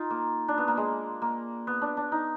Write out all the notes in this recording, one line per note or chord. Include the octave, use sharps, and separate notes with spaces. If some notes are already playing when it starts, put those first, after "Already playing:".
Already playing: D#4 F4
A#3
D4
B3
A#3
G#3
A#3
B3
D4
D4
D#4